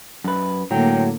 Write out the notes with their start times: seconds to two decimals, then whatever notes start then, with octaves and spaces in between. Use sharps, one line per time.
0.24 F#2 B4
0.71 A2 D3 F#3 A#3 G5